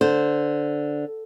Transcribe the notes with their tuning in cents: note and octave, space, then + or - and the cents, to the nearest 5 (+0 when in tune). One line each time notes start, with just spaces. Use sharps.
D3 +0 C5 -5